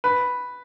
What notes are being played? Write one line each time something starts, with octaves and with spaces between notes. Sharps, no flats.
B4